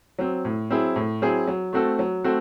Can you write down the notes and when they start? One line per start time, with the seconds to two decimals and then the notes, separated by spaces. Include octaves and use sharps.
0.19 F#3 C4
0.45 A2
0.70 F#3 C4 E4 G#4
0.96 A2
1.22 F#3 C4 E4 G#4
1.47 F#3
1.73 A3 C4 F#4 A4
1.99 F#3
2.24 A3 C4 F#4 A4